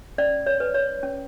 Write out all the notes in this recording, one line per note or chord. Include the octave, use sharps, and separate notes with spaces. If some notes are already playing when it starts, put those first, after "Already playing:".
C#4 D5
C#5
B4
C#5
C#4